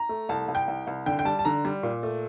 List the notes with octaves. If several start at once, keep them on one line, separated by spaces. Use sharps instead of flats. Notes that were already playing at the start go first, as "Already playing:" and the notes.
Already playing: A#5
A3
C2 A5
C2
G5
C2
C2
D3 G5
G5
G3 A5
A5
D3 A#5
G3
A#2
A3